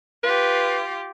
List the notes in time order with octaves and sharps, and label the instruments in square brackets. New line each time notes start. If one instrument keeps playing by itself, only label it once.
[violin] F4 G4 [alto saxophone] B4